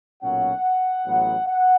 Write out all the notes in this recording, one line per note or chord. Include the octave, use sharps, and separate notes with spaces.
B1 A#2 F#3 A#3 C#4 F#5
A1 A2 F#3 B3
F#5